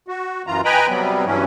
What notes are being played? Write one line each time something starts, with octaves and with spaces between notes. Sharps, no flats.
F#4
F#2 E3 F4 A#5
B4 D#5 G5 G#5 A#5 B5
C3 F#3 G3 B3
G2 E3 F#3 C#4